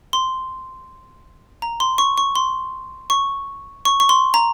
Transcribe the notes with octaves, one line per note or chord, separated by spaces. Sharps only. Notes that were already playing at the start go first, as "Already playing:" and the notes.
C6
A#5
C6
C#6
C#6
C6
C#6
C#6
C#6
C6
A#5